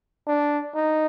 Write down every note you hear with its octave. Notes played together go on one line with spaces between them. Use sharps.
D4
D#4